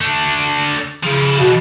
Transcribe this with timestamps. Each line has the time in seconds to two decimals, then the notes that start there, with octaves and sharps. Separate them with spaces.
0.01 A3 D4
1.03 C#3 F3 E4
1.39 B2